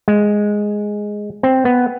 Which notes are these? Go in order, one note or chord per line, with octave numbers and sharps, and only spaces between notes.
G#3
C4
B3